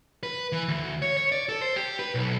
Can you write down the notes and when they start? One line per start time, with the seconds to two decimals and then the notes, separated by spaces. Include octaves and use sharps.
0.23 B4
0.52 E3
0.68 D2
1.02 C#5
1.17 C#5
1.32 D5
1.49 A4
1.61 C5
1.76 G4
1.99 B4
2.15 B1